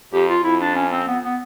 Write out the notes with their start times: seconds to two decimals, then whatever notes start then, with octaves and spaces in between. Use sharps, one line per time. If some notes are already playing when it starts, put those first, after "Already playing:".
0.13 F2 G4
0.29 F4
0.44 F2 E4
0.61 D4
0.75 C#4
0.92 C4
1.07 B3
1.24 B3